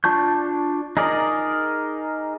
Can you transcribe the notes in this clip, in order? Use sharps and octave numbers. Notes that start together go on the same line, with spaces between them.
D4 F4 A5 C#6 G6
D#4 G#4 A#4 D5 D#5